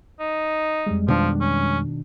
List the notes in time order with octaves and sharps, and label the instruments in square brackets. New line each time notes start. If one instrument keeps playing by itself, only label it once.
[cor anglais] D#4
[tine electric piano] F2 G3 G#3
[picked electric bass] B2 D#3 D4 [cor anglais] F3
[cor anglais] C#4